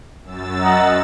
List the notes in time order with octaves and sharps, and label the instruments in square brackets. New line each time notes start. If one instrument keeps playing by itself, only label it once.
[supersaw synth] F#2 E6 A6
[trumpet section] D#5 F#5 A#5